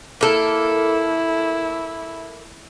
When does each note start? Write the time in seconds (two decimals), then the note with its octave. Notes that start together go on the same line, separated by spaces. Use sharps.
0.21 A#3 E4 A4